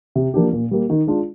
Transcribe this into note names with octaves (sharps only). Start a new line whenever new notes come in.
C3
F3 A#3 D4 G4
A#2
G3 A#3
D#3
G#3 D4 F4